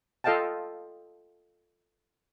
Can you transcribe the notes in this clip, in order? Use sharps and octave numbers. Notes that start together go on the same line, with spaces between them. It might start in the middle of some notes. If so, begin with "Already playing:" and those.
F4 A4 D#5 F5 G5 A5